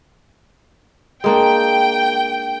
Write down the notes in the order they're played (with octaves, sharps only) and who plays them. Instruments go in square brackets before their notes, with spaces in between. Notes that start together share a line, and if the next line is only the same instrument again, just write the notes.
[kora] G#3 A#3 D4 [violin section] G5